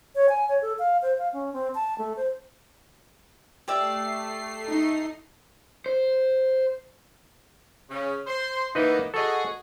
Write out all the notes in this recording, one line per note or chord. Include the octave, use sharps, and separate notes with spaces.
C#5
G#5
C#5
A4
F5
C5
F5
C#4
C4
A5
A3
C5
A3 G4 D5 E5 C7
D#4
C5
C#3 C#4
C5 C6
E3 A#3 B3 D#4 B4 D#5
F#4 G#4 A4 D#5